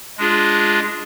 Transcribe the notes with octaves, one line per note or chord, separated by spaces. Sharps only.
G#3 D4 F4 G#4